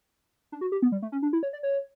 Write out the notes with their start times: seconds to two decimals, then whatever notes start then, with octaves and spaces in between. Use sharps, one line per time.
0.52 D4
0.61 F#4
0.72 G4
0.82 B3
0.92 G3
1.02 A3
1.12 C#4
1.22 D4
1.33 E4
1.43 C#5
1.53 D5
1.63 C#5